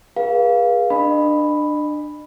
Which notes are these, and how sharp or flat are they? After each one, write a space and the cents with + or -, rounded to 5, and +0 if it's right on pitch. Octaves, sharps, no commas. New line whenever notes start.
G#4 -15 B4 -40 F5 +0
D4 +20 D#5 -35 B5 +0